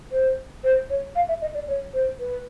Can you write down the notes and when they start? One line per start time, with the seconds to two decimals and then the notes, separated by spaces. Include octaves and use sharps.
0.11 C5
0.64 C5
0.90 C#5
1.16 F5
1.28 E5
1.42 D#5
1.55 D5
1.68 C#5
1.94 C5
2.20 B4